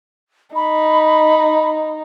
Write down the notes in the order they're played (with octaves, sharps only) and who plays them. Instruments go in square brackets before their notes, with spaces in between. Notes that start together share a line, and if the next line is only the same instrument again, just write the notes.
[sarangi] D#4 [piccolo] B5